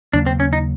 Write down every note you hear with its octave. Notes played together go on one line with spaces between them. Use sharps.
D#2 C#3 F#3 A#3 D4
C4
C#4
D#4